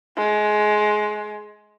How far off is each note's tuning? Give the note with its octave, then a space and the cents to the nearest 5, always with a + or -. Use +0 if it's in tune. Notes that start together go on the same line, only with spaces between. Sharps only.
G#3 +20